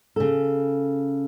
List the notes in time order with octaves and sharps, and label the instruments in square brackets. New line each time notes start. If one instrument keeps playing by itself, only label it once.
[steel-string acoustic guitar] C#3 A4